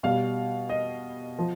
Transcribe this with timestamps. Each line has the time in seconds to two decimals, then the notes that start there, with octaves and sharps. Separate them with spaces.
0.03 B2 G3 F5
0.70 D#5
1.39 F3